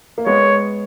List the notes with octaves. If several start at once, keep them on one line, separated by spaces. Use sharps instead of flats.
A#3
G#3 B3 C#5